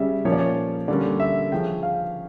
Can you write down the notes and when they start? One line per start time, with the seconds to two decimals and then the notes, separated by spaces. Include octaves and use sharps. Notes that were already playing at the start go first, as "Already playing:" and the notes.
Already playing: C#3 G3 C#4 E5
0.25 A#2 F3 A#3 C#4 C#5
0.32 D5
0.40 C#5
0.88 D3 G3 A#3 C#4 D5
1.20 E5
1.51 C#3 F3 C#4 G5
1.83 F5